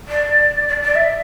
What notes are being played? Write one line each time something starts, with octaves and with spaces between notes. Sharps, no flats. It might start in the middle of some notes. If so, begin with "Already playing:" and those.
D5
D5
D5
E5